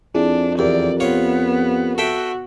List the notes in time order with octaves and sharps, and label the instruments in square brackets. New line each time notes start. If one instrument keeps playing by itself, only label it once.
[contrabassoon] F2 [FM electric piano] C4 E4 G#4 [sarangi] D4
[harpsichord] E2 [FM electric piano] G4 A#4 [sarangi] D5
[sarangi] B3 [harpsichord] F4 C#5
[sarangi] F#4 [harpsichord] A4 E5 G5